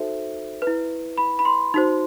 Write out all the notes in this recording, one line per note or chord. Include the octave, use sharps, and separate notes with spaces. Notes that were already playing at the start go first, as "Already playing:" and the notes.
Already playing: D#4 F#4 A4 C5 E5
B4
E4
B5
B5
C6
D#4 F#4 C5